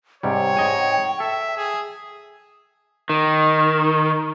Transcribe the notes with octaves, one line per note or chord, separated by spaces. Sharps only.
G#2 C3 G3 C#5 G5
G#2 D#5 G#5
A4 E5
G#4
D#3